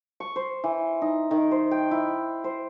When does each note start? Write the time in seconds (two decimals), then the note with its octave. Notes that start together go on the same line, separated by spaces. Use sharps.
0.20 C#6
0.36 C5
0.64 E3
1.02 D#4
1.31 D#3
1.51 C5
1.71 G5
1.91 E4
2.44 C5